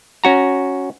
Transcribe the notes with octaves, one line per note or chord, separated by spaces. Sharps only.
C#4 F#4 A#5